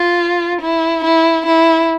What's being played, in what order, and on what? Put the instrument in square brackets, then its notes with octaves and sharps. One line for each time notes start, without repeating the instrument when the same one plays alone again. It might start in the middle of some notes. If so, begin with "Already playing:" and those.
Already playing: [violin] F4
E4
E4
E4